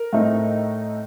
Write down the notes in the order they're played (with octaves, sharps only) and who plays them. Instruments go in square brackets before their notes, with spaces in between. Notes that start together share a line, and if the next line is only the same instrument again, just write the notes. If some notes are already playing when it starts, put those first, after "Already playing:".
Already playing: [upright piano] A#4
A2 A3 C4 D#4